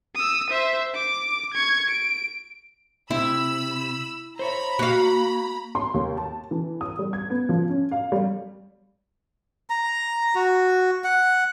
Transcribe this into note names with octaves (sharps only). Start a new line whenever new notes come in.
D#6 E6
C5 E5
D6
C#6 G#6
D7
C3 E4 B5 E6
C5 C#5 E5 A#5 B5
A#3 F#4 F5
C6
D#2
A5
E3
D#6
G3
G#6
B3
F3
C#4
F5
G3
A#5
F#4
F#5